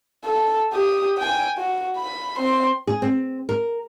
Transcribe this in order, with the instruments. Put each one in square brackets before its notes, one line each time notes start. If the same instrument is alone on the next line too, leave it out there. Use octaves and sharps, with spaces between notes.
[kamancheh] A4
G4 D#6
G5 G#5
F#4
B5
C4 C6
[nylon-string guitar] G#4
C4
A#4